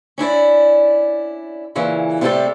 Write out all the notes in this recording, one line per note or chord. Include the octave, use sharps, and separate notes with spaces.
C#4 D4 E4 D5
A#2 C#3 E3
C3 G3 A3 E4 G4 A4